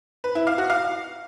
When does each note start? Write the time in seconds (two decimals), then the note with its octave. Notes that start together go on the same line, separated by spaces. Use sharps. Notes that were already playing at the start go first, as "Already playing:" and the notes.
0.24 B4
0.35 E4
0.47 F5
0.58 F#4
0.70 F5